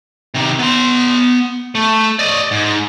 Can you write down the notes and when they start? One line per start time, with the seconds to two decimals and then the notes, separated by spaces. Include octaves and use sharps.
0.34 C3 D#3
0.59 B3 C6
1.75 A3
2.19 D5 D#5
2.51 G#2